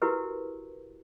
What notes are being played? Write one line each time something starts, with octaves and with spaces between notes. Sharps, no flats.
E4 F#4 G4 A#4 B4